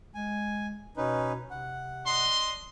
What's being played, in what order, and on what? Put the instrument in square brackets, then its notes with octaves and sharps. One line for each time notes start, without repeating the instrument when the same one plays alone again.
[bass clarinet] G#3 [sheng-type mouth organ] G#5
[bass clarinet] B2 [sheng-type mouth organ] C#4 D#4 B4
[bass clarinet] C3 [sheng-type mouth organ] F#5
[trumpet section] D4 D#5 C6